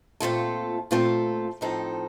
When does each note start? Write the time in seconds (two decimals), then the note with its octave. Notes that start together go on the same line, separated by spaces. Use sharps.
0.20 A#2 A3 C4 F4 A4
0.91 A#2 A3 C4 F4 A4
1.61 A2 F3 C4 D#4 A4